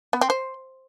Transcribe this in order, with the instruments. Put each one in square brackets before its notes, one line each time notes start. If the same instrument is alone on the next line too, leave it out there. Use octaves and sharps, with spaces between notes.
[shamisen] B3
C4
C5